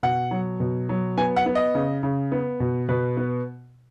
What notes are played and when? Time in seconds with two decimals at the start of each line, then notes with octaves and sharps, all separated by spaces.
0.03 B2 F#5
0.31 F#3
0.60 B2
0.89 F#3
1.17 B3 G#5
1.36 F#5
1.46 B3
1.55 D#5
1.75 C#3
2.03 C#3
2.32 B3
2.60 B2
2.89 B2 B4
3.17 B3